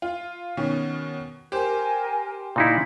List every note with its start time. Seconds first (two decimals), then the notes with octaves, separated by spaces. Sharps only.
0.02 F4
0.57 B2 D#3 C#4
1.52 G4 A#4 C5 G#5
2.56 A#2 D#4 E4 B5